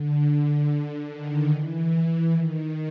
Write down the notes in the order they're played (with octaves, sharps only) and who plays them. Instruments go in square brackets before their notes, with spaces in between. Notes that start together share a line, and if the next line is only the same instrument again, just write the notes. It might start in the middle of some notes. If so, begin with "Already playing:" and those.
Already playing: [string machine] D3
D3
D#3
E3
D#3